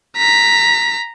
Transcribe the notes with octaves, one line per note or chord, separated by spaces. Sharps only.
A#5 B6